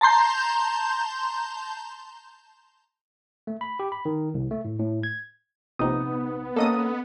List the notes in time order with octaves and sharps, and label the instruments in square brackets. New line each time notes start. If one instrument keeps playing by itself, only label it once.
[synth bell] A5 A#5 C6 G6
[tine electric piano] A3
B5
G4
B5
D#3
C2
A3
A2
A2
G#6
[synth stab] A#1 C3 [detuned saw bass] B3 [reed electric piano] D#4 D#6
[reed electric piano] A#3 C#4 [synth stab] A4 D#5 D#6